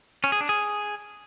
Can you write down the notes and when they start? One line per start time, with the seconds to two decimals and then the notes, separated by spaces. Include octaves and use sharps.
0.24 C#4
0.32 G#4
0.41 D4
0.49 G#4